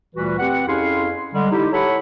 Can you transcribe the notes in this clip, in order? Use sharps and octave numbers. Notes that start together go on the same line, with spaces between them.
D2 A#2 E3 G3 F#4 B4
C4 G4 B4 F#5
F2 C#4 E4 G#4 F5 C6
D3 G3 G#3
D#4 E4 G4
E4 A4 C#5 F#5 B5